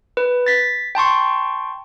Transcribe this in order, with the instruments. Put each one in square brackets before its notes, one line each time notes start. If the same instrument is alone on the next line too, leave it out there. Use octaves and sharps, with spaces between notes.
[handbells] B4
A6 B6
G5 A5 C6 C#6